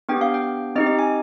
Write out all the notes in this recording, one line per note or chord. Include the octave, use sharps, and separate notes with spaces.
B3 D4 G4 G5
F5
G5
C4 D#4 G4 D#5
D#5
G#5